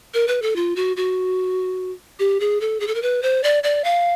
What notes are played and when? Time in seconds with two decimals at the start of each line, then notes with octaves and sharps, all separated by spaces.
0.14 A#4
0.28 B4
0.42 A4
0.56 F4
0.76 F#4
0.97 F#4
2.19 G4
2.40 G#4
2.61 A4
2.80 G#4
2.87 A4
2.95 A#4
3.02 B4
3.23 C5
3.44 D5
3.64 D5
3.84 F5